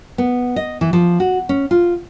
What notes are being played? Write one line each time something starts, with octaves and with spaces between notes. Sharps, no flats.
B3
D#5
E3
F3
F#4
C#4
F4